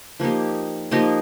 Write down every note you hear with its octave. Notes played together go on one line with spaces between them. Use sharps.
F3 A#3 D#4 G4
F3 A#3 D#4 G4